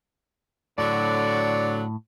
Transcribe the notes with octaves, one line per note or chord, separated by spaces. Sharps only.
A2 D3 F#3 D5